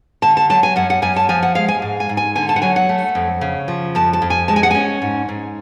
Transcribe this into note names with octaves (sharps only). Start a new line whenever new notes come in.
D3 A5
A5
F#3 A5
G#5
F#2 F#5
F#5
F#2 G#5
A5
F3 G#5
F#5
G#3 F5
G#5
G#2
G#5
G#2
G#5
D3 G#5
A5
F#5
F#3 G#5
F#5
A3
F2
C#3
F3
F2 A5
A5
F2
G#5
G#3 A5
G#5
F#5
C#4 G#5
G#2
G#2